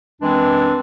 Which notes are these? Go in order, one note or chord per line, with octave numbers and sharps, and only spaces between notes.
F#2 E3 G#3 C4 D4